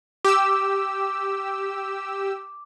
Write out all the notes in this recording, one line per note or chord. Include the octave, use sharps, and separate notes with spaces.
G4 D6 E6